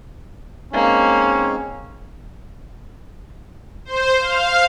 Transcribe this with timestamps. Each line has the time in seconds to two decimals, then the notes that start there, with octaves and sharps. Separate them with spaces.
0.73 G#3 A#3 C4 C#4 D#4
3.85 C5
4.19 F5